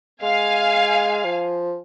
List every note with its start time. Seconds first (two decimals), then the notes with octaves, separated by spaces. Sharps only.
0.22 G#3 F5 G#5
1.24 F3